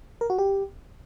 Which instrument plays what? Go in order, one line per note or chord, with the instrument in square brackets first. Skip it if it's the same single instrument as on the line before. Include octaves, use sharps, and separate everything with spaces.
[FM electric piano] A#4
F#4
G4